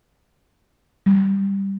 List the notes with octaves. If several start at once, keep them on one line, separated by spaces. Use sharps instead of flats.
G3